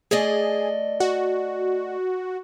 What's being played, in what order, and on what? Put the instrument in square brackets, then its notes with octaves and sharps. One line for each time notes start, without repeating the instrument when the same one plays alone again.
[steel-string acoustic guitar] A3 D5 D#5 [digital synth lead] G#4
[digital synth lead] F#4